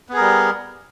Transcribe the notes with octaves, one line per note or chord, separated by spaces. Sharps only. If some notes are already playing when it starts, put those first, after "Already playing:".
G3 B3 G#4 A#4